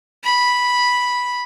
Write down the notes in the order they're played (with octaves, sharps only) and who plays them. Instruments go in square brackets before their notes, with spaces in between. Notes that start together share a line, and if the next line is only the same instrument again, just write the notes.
[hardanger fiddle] B5